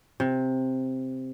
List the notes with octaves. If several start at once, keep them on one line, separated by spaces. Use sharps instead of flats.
C3